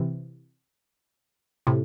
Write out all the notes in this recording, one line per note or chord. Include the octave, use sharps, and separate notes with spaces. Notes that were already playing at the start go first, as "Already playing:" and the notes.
Already playing: C3 E3
A2 C3